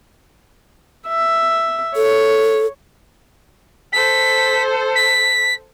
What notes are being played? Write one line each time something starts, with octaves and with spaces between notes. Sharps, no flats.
E5
A4 C#5
A4 C5 B6
B6